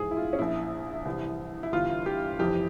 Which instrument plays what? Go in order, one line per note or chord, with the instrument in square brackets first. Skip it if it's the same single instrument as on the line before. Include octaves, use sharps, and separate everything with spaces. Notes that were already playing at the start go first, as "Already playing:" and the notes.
Already playing: [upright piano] A#1 G#2 E3 G#4
E4
F4
C#4
A#1 A#2 E4
C2 C3 E3
E4
G1 G2 E3 F4
G4
F1 F2 E3 G4